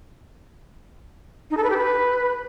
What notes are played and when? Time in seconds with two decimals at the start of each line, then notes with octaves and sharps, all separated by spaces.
1.50 D#4
1.57 A4
1.64 B4
1.70 G4
1.77 B4